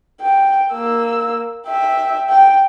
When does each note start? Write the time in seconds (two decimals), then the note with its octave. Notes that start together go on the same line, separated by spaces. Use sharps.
0.21 G5
0.72 A#3 E6
1.67 E5 G5
2.30 G5